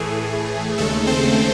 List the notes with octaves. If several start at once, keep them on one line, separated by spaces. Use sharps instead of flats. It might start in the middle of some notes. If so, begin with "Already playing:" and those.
Already playing: A2 E3 A3 G#4
D#2 C#3 G#3 A3 A4
C4 C5